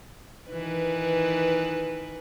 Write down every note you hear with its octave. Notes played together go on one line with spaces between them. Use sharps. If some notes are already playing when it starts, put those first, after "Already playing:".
D#3 E3 B4